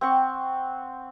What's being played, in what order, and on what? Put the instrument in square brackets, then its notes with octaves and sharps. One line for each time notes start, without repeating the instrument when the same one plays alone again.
[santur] C4 F#5 C#6